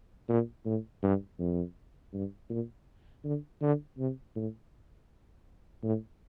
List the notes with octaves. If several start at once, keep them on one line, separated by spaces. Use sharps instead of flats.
A#2
A2
G2
F2
G2
A#2
D3
D3
C3
A2
A2